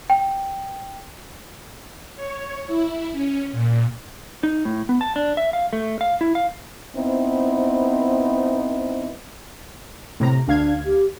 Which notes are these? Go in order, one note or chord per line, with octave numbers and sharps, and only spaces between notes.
G5
C#5
E4
C#4
A#2
D#4
A2
B3
A5
D4
E5
F5
A3
F5
E4
F5
B3 C4 D#4 E4 C5
A2 C3 A#5
D2 D4 F5 G#6
G4